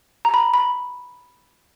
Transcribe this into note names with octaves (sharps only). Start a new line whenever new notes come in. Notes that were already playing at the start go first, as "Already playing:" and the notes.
A#5
B5
B5